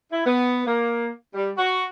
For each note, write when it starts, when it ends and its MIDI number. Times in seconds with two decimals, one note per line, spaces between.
0.11 0.22 64
0.26 0.62 59
0.66 1.11 58
1.35 1.50 55
1.57 1.85 66